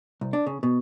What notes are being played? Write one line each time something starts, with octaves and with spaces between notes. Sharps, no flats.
C2
D4
C#3
B2